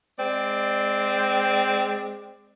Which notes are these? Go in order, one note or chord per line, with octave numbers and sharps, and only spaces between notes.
G#3 C4 D5